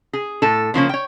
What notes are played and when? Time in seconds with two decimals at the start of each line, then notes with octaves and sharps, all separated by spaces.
0.13 G#4
0.42 A2 A4
0.74 C#3 F3 A#3 C#4
0.89 C#5 G5